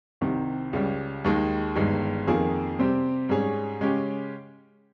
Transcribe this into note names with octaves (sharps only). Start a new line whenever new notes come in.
C2 C3 D#3
C#2 C#3 G3
D#2 D#3 G#3
G1 G2 D#3 G#3
F2 D#3 A#3 F4 G#4
C3 G3 C4 G4
G#2 G3 C#4 G#4 C#5
C#3 G#3 C#4 G4